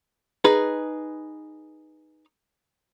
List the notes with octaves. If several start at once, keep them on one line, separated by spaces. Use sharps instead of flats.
D#4 G#4 B4